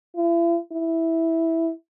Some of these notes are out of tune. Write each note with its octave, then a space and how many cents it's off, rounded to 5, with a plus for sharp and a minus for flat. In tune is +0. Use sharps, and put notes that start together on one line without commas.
E4 +45
E4 -5